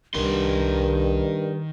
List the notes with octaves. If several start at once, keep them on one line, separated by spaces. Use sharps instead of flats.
C2 G2 D#3 A#4 C6